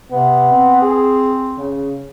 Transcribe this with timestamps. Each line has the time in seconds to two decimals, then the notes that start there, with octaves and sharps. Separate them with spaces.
0.11 C3 B3
0.52 C4
0.82 G#4
1.57 C#3